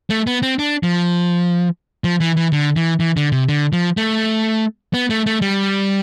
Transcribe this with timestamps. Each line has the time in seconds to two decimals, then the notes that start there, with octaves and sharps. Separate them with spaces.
0.10 A3
0.27 B3
0.42 C4
0.59 D4
0.83 F3
2.04 F3
2.20 E3
2.36 E3
2.52 D3
2.76 E3
3.00 E3
3.17 D3
3.32 C3
3.49 D3
3.73 F3
3.97 A3
4.94 B3
5.10 A3
5.26 A3
5.41 G3